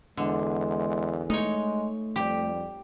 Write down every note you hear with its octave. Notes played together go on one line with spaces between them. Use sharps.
E2 D3 G#3
G#3 A3 D#4 C#5
F2 G3 G4